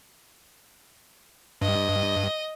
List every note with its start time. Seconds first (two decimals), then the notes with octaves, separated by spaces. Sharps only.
1.62 G2 D#5